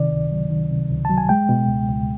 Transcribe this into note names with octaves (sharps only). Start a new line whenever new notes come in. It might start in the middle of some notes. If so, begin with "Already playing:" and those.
Already playing: C3 D#3 D5
C#2
F#3
D#3
C3
C#2
A5
F#3
G#5
G#3 G5
B2
C#2
C#2